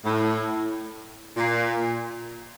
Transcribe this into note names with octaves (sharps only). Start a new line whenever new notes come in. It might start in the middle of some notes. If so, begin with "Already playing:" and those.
A2
A#2